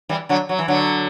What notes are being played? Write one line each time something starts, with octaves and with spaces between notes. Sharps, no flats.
E3 G3
D3 F#3
F#3
E3
D3 F#3